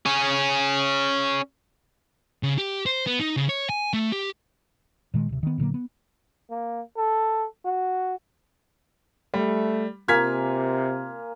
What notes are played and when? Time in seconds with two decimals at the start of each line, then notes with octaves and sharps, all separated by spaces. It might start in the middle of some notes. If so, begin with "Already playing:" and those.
0.06 C#4 G#4
2.43 C#3
2.58 G4
2.86 C5
3.07 B3
3.20 D#4
3.37 C#3
3.49 C#5
3.69 G#5
3.93 A3
4.12 G4
5.14 A#2 D#3 G#3
5.29 D1 C3
5.43 D#3 B3
5.58 A#2 D3 F#3 A#3
5.74 B3
6.51 A#3
6.97 A4
7.65 F#4
9.34 G3 A3
10.08 C3 A#3 F4 G#5 F6 G#6 B6